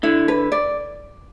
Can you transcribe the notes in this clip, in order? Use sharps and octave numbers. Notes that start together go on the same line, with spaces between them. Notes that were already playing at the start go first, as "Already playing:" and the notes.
D3 E4
B4
D5